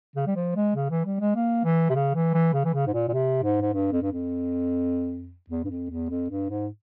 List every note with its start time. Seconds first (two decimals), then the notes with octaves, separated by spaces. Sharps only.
0.16 C#3
0.26 G3
0.36 F3
0.56 G#3
0.75 C#3
0.90 E3
1.05 G3
1.20 G#3
1.35 A#3
1.64 E3
1.90 C3
1.95 C#3
2.14 E3
2.34 E3
2.53 C#3
2.65 E3
2.74 C#3
2.87 G#2
2.93 A#2
3.09 A#2
3.13 C3
3.43 G#2
3.61 G#2
3.73 G2
3.92 F2
4.02 G2
4.12 F2
5.50 E2
5.64 G2
5.70 F2
5.90 E2
6.10 F2
6.30 G2
6.49 G#2